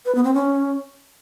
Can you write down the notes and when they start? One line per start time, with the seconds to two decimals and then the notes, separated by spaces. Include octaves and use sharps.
0.05 B4
0.15 B3
0.24 C4
0.34 C#4